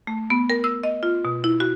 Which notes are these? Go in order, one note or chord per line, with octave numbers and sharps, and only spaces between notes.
A3
B3
A#4
E6
D#5
F4
B2
E4
F#4